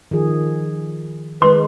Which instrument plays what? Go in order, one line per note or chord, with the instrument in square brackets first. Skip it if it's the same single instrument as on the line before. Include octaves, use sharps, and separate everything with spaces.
[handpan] D#3 F3 G#4
[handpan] D#3 G#3 D#4 [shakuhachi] B4 [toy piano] C6